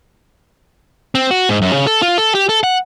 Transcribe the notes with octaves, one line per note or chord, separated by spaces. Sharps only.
C4
F#4
G#2
F#2
C#3
A4
F4
A4
G4
A4
F#5